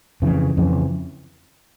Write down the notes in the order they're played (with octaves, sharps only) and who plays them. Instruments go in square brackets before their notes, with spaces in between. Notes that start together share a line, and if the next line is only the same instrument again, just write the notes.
[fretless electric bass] F2 C#3 E3
F2 C#3 E3